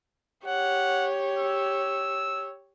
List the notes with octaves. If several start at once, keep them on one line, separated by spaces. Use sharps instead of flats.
G4 C#5 F#5
E6